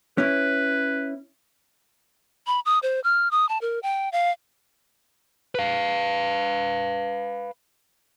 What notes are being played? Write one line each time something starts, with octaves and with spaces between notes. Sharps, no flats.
C#4 E4 B4
B5
D#6
C5
F6
D#6
A5
A#4
G5
F5
B4 F5